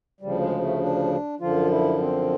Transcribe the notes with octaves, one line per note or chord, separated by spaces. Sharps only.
D2 C#3 F3 G3
G#3
A3
D4
F#2 D3 F3 F4
E4
C4